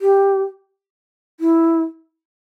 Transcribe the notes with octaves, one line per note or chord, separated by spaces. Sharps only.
G4
E4